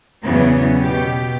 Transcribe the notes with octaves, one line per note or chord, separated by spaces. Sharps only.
E2 C#3 E3 F#3 B3 C#4
B2 G4